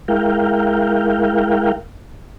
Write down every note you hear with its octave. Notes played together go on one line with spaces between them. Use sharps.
G#3 E4 A#4 F5 G5